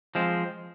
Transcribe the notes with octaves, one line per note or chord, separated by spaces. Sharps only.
F3 G#3 C4